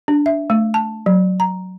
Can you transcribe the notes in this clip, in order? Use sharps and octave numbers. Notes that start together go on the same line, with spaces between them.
D4
E5
A3
A5
F#3
A#5